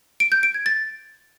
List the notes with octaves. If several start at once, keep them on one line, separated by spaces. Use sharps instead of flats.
D7
G6
D7
G#6
A6